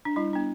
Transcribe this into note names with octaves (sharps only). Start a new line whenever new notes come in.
D4
G3 E4
B3 D4